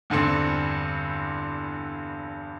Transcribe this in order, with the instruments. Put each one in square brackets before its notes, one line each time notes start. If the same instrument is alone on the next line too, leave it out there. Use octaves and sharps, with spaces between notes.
[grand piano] E2 G2 D3 C4